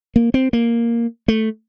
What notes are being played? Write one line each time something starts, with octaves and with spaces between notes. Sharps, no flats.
A#3
C4
A#3
A3